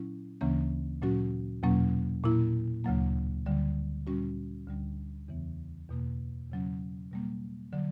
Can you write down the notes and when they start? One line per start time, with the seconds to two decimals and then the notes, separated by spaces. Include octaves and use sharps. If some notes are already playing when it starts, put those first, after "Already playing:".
Already playing: A#2 F#3 C#4 E4
0.41 D2 C#3 E3 A#3 C#4
1.02 A#2 F#3 C#4 F#4
1.63 E2 B2 F#3 A#3 C#4
2.24 A#2 A#3 E4
2.84 D2 C#3 F#3 A#3
3.46 D2 D3 G3
4.07 A#2 G3 C#4 F#4
4.67 D2 D3 G3
5.28 E2 C#3 E3 B3
5.89 E2 B2 A#3
6.50 E2 C#3 F#3 C#4
7.11 B2 G3 A#3
7.73 D3 F#3